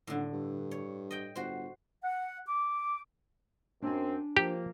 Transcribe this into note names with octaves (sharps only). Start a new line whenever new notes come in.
D#1 A2 D3
G2
C#5
D#5 G5
G1 F#4 C5
F#5
D6
F#2 C4 D4 G#5
F3 A#3 G4